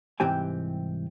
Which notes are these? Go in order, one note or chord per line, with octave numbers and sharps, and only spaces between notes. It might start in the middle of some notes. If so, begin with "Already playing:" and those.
C2 G#2 E3 C4 G4 G#5